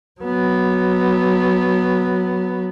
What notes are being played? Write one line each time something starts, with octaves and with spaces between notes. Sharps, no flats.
F#3 B3